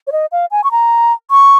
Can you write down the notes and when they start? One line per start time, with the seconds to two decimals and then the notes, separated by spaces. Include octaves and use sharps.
0.07 C#5
0.12 D#5
0.32 F5
0.51 G#5
0.64 C#6
0.71 A#5
1.31 C#6